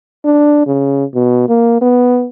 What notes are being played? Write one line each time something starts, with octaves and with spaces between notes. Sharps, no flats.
D4
C#3
B2
A#3
B3